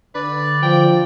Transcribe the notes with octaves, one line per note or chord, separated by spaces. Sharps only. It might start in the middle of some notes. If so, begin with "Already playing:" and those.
D3 B4 D5
F3 G5